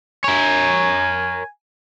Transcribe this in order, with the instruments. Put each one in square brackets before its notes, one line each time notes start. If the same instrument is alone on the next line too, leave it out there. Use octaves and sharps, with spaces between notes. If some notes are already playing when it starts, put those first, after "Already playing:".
[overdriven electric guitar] A#4 C#5 [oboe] G#5